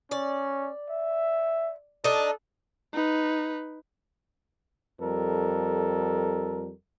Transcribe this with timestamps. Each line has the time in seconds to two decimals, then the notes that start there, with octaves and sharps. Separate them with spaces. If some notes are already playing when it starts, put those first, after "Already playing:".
0.11 C#4 D5
0.90 E5
2.04 D4 D#4 A4
2.93 D#4 B4
5.01 F2 G3 A4 A#4